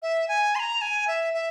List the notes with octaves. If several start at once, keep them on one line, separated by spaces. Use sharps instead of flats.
E5
G#5
C6
A#5
G#5
E5
E5